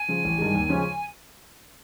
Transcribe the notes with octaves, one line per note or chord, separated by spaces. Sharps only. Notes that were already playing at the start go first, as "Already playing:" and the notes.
Already playing: G#5
C#3 F3
A1
G2 D#3 G#3
D#2
C#3 F3 G#3 C#4